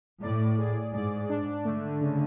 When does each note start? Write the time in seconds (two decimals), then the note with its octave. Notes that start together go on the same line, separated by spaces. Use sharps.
0.22 A2 D5
0.58 G#4
0.93 G#2 D5
1.29 D4
1.65 D3 A3
2.01 C#3